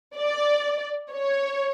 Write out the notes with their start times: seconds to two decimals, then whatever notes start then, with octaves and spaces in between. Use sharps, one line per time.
0.16 D5
1.12 C#5